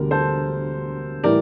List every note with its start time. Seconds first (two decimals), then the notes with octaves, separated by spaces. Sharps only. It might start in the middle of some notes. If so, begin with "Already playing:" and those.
Already playing: E1 D2 D3 G3 A#4
0.11 A4 C5
1.24 A2 E3 G3 A#4 D5